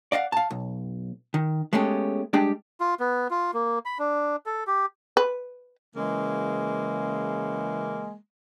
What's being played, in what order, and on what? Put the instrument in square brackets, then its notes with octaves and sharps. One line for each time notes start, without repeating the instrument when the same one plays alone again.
[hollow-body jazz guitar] D5 D#5 F5 F#5
F5 A5
B1
D#3
G#3 A3 B3 C#4 G4
G3 G#3 D4 G4 G#4 G5
[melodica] F4
B3
F4
A#3
B5
D4
A4
G4
[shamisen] B4
[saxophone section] C#3 E3 G#3 A#3